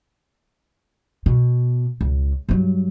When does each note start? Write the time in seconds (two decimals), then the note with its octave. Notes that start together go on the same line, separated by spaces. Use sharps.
1.26 B2
2.01 C#2
2.49 G2 F#3